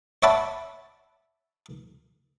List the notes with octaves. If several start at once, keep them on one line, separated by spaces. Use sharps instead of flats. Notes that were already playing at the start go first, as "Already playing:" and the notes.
C#5 D5 E5 F#5 A5 B5